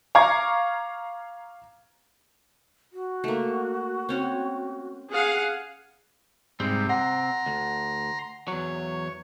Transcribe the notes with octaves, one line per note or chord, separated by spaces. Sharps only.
F5 A#5 C#6 D6 G#6
F#4
A3 A#3
C4 C#4 C#5
G#4 F5 F#5
G#2 C3 G3 C4
F#5 A#5 C6
D2
E2 F#3 C#5